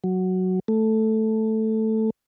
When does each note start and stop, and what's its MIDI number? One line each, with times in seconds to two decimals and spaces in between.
0.04 0.60 54
0.68 2.10 57